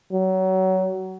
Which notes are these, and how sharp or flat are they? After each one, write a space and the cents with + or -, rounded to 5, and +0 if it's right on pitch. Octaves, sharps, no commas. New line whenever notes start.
F#3 +25